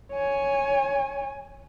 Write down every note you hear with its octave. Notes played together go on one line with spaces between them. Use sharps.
C#5 G#5